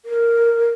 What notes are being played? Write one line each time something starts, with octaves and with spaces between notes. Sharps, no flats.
A#4